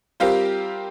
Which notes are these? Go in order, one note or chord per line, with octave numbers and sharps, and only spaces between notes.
G3 C4 F4 G4 A#4 F5